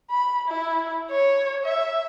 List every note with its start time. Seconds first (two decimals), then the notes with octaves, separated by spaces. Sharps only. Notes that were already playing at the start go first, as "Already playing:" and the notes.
0.11 B5
0.48 E4
1.11 C#5
1.65 E5